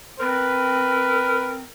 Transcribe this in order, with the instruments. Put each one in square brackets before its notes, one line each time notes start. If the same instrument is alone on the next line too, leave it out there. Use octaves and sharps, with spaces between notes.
[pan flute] C4 [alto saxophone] A#4 [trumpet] B4